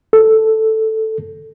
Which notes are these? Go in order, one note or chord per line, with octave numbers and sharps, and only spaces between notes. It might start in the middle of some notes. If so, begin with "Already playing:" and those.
A4